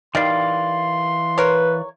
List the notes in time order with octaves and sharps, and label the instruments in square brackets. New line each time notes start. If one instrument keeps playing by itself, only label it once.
[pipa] D#3 G3 [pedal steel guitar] E3 D5 F5 [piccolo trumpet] C6
[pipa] A#4 C#5 [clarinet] B4